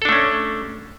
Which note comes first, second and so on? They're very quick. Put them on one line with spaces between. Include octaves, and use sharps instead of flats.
A4 D4 A3 C#4